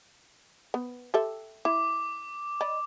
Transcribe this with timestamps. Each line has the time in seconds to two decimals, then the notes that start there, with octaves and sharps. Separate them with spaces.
0.74 B3
1.14 G4 A4 E5
1.65 E4 D6
2.61 D5 D#5 B5